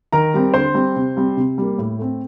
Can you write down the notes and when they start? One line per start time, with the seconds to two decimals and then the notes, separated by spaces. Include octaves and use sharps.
0.13 D#3 A#4 A#5
0.34 G3 C4
0.54 D3 C5 C6
0.74 G3 C4
0.96 C3
1.17 G3 C4
1.37 C3
1.58 G3 A#3
1.78 A2
1.99 A3 C4